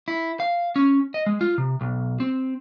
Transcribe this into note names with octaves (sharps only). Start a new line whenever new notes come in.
E4
F5
C#4
D#5
G#3
F4
C3
B1
C4